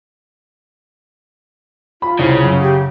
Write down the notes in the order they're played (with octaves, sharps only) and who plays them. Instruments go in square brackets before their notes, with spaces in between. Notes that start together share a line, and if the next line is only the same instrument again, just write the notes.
[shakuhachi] F4 [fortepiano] B5
[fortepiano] C2 [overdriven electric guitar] C#3
[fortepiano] F#2
[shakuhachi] G4